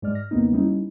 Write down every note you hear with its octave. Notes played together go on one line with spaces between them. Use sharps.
G#2 G#3 D5 F6
F6 A#6
E2 C#3 A#3 B3 D#4
G3 C#4 D#4 E4